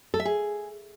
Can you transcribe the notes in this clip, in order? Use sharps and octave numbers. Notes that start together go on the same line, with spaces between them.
A4
E5
G#4